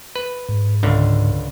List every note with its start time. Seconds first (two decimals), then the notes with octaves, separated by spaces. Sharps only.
0.15 B4
0.49 G#2
0.83 C#2 D3